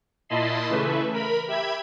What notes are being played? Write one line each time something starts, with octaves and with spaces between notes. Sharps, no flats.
A#2 E4 D#5 A5 B5 C6
C#3 E3 A3 B4 E5
A#4 B5
G4 E5 B5 G#6